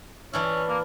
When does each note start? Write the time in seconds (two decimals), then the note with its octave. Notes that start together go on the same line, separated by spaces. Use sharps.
0.33 E3 C#4 D4 E4
0.69 A#3